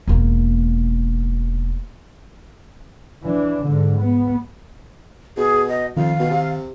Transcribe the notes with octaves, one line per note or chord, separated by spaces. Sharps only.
E1 A#3
E3 D4
G#2 D3
B3
B2 G#4
D#5
F2 D#3 F5
B2
C3